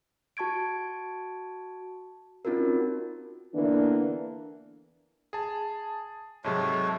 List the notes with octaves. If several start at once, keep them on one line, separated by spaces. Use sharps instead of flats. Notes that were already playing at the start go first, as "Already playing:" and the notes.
F#4 A5 C#6 G#6 D7
C4 C#4 D#4 F4 F#4 A#4
D3 E3 A#3 B3 D4
G#4 A5
G#2 C3 F#3 G#3 A3 C#5